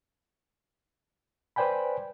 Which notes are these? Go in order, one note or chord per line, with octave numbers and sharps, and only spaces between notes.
B4 C5 D5 G5 G#5 B5